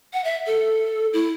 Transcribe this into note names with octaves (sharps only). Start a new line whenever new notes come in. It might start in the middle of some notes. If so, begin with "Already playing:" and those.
F#5
E5
A4
E4